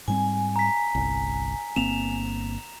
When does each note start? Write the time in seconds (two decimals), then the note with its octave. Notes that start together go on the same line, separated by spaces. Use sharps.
0.08 G#2 G3 C4 G#5
0.56 A#5 B6
0.95 G1 C2
1.76 G1 A#3 C4 E7 F7